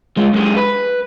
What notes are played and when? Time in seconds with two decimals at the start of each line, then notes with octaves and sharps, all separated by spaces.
0.17 G#3 F4
0.33 F#2 G#3
0.56 B4